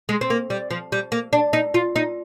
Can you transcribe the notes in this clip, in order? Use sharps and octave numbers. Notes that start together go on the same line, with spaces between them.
G#3
C4
A#3
G3
F3
G3
A#3
D4
D#4
F4
D#4